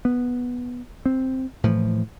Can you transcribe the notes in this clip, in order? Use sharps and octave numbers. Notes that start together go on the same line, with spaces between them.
B3
C4
A2 E3 F3